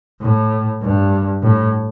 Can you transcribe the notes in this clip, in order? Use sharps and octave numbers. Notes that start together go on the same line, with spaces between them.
A2
G2
A2